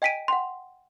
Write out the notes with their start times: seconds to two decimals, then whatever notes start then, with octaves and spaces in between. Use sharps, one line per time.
0.02 D#5 G5 G#5 B6 D7 D#7
0.28 F#5 G5 C6